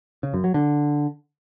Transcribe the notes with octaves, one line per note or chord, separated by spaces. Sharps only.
C#3
F#2
F#3
D3